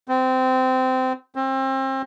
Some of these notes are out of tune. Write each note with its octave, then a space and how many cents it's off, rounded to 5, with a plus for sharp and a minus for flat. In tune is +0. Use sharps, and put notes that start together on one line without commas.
C4 -20
C4 +30